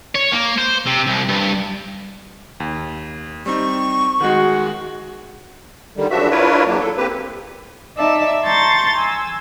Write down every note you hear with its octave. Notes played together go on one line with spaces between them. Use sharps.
C#5
A#3
C5
C3
C2
G2
D#2
G3 C4 D#4 C#6
D#3 G#3 F#4
D3 D#3 G3
F#2 C#3 F3 D4 F#4 E5
D4 E4 F4 A#4 B4 C#5
E2 F#3 A#3 D4
A4
A#3 C4 G4 B4
D#4 D5 E5 A5
A5 A#5 C6 C#6 G6 A6
G#5 E6